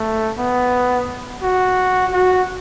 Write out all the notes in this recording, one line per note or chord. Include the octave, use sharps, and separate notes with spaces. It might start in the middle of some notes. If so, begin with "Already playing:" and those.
Already playing: A3
B3
F#4
F#4